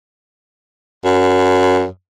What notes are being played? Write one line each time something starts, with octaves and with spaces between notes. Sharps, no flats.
F#2